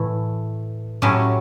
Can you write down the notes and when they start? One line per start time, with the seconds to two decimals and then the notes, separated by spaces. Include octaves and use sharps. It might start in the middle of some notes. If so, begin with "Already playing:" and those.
Already playing: A2 E3 A3
1.02 A2 F#3 C#4 G4